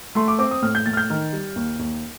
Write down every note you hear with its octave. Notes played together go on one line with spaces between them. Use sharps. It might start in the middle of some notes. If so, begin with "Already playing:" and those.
A3 C6
D6
C4 D6
D#6
A2 F6
G6
A2 A6
F6
G6
D#3 F6
G3
D#2
D#2